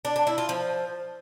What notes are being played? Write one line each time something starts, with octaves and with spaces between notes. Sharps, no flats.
D4
D4
E4
F4
F3